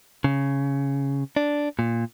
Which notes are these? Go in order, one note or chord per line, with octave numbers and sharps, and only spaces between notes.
C#3
D4
A#2